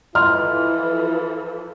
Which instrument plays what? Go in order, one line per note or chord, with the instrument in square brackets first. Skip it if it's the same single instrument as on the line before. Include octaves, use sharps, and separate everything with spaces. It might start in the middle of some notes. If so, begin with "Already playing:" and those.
[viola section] E3 F3 A4 [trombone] E4 [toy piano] D#5 C6 [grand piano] F6